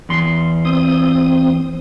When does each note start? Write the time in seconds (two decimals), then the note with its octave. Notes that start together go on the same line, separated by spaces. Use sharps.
0.09 E2 C6
0.65 C4 D#6